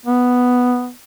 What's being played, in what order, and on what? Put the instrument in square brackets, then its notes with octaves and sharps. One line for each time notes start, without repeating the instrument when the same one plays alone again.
[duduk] B3